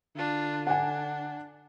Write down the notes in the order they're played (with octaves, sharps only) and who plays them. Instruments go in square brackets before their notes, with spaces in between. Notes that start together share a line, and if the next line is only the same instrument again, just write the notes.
[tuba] D3 [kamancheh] D4 F4
[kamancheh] D4 [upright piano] F#5 G#5